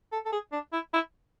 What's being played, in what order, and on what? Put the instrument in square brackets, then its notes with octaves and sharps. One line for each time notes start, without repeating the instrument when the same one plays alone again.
[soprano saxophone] A4
A4
G#4
D4
E4
E4